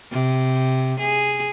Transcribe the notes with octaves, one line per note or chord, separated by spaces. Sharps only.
C3
G#4